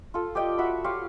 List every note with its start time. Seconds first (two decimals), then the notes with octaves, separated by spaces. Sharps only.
0.14 F4 A4
0.35 G4 D5 D#5 G5
0.58 F#4 E5 F#5 B5
0.84 F4 G4 C#5 F5